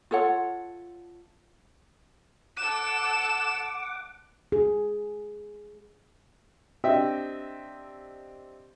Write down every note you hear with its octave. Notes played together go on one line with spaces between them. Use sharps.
F4 A4 C#5 F#5
A4 F#5 D6 E7
G#4
C4 D4 G4 D#5 E5 G5